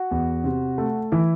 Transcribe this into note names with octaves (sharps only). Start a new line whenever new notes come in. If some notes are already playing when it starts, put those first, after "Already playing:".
Already playing: F#4
E2
C3
A3
E3 E4